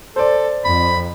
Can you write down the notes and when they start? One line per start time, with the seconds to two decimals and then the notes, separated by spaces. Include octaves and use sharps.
0.16 A4 C5 D5
0.65 F2 B5